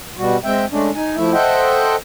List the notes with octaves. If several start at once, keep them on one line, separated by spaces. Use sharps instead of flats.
B2 G3 F#4
G#3 C4 E5 G5
G#3 A3 C#4 D4
D#4 G#5
F3 A3 E4 E5
A4 C5 D#5 E5 F#5 G5